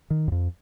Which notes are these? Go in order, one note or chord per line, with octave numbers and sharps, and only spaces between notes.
D#3
F#2
F2